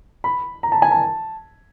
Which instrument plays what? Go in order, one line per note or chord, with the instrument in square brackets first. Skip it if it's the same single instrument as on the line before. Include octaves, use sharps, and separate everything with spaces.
[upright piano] B5
A#5
A5
G#5
A5